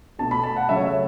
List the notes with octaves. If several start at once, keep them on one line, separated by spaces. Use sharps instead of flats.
B2 A3 A5
B5
A5
F#5
C#3 F#3 A3 E5
C#5
E5